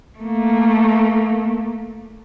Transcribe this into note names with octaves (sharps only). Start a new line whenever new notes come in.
A3 A#3